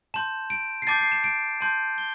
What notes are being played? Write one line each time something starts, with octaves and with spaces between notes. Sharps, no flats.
A5 C6 G6 E7
D7
C7
A5 D6 G6 A6
C7
E7
D7
A5 C6 G6
G7